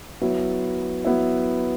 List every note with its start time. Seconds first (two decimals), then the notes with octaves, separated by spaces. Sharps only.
0.21 F#3 B3 E4
1.05 F#3 B3 E4